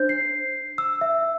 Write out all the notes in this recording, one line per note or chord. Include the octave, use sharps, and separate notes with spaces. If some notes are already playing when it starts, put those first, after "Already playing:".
Already playing: D4 C5 G6
C7
E6
E5